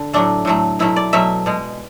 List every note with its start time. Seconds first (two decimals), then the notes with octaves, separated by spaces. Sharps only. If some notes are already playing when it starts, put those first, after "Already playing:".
Already playing: D3
0.13 A2 F#3 A3 D4
0.45 A2 F#3 A3
0.79 B2 F#3 A3 E4
0.96 D5
1.13 B2 F#3 A3 E5
1.46 B2 G#3